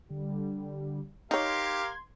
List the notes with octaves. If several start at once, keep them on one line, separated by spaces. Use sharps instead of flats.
D3 G3
D#4 G4 A#4 C#5 F5 C6 G#6